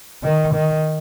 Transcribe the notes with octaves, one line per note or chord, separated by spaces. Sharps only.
D#3
D#3